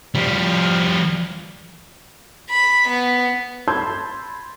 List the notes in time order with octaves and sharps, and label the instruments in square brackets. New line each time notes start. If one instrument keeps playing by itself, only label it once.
[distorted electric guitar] F3 G3
[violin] B5
B3
[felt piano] A5 B5 C6 E6 G6 G#6